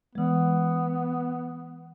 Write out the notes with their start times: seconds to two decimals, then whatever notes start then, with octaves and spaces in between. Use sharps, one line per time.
0.15 E3 G#3 B3